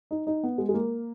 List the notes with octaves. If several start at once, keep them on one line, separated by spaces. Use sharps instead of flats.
D#4
D#4
B3
G#3
G#3
A#3